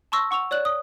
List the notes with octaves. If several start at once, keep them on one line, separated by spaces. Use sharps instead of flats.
A5 C6 C#6 E6 A#6
F#5 C#6 E6 F7
C#5 D5 F#6 F#7
D#6